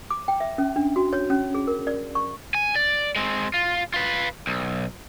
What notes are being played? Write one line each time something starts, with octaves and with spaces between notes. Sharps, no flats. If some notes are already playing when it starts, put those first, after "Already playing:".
D6
G5
E5
C#4
D4
F#4
C#5
C#4
G#4
A#4
D5
C#6
G#5
D5
G#3 C4
F4
F4 B4
B1